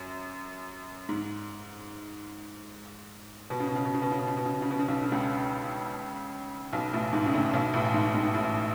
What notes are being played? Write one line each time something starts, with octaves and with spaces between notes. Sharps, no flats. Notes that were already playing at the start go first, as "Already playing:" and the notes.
Already playing: F#2
G#2
B2
C#3
B2
C#3
B2
C#3
B2
C#3
B2
C#3
B2
C#3
B2
C#3
B2
C#3
B1 B2
D3
C#2 C#3
B1 B2
A1 A2
G#2
C#3
D2 D3
B1 B2
A1 A2
G#2
G#2
A1 A2